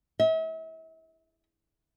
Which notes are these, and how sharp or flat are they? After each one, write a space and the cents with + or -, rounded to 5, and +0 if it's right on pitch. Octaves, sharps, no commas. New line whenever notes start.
E5 -40